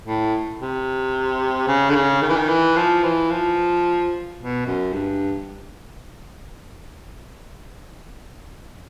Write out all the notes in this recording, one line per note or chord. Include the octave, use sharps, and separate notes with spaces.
A2
C3
C#3
D3
C#3
D#3
E3
D#3
E3
F3
E3
F3
B2
F#2
G2